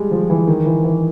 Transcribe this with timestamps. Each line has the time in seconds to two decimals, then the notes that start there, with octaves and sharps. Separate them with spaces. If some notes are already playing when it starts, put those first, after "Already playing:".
Already playing: G3 G#3
0.11 F3
0.30 E3
0.47 D#3
0.66 E3
0.84 E3